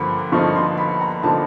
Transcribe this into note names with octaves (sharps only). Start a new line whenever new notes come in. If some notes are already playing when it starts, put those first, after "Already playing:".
Already playing: G2 D3 F3 A#3 B5
G2 D3 F3 A#3 D#4 C#6
C6
B5
A#5
D3 F3 A#3 D#4 A5